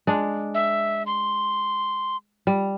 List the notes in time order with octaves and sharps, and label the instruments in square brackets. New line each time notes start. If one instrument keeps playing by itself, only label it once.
[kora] G#3 D4
[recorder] E5
C6
[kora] G3